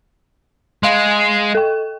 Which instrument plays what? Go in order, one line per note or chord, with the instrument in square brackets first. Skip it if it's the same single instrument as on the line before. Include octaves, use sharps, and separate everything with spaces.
[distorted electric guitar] G#3 [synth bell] F5 C6
[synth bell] A4 G5